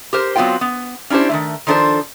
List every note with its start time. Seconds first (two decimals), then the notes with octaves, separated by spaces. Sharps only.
0.13 G4 A#4 C5
0.36 F#3 B3 C4 F4 G5
0.61 B3
1.10 C#4 D4 E4 G4 C5
1.30 D#3 E3 A3
1.67 D#3 F3 D4 A4 C5